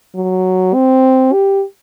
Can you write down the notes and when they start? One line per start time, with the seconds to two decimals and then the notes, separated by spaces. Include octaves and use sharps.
0.15 F#3
0.74 C4
1.33 G4